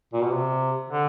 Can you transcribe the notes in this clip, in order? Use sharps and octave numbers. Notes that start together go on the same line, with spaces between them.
A#2
B2
C3
D3